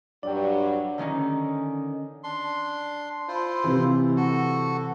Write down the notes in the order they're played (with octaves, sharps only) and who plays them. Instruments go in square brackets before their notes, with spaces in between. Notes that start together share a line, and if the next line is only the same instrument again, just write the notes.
[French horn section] G2 F#3 G3 [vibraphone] D4 [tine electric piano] D5 G5
[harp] D3 D#3 C#4 D#4
[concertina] D4 C6
E4 F4 C5
[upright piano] C3 E3
[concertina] F#4 A4